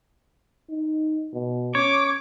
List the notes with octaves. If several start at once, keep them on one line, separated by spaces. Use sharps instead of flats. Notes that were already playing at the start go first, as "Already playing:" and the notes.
D#4
B2
C#4 C#5 D6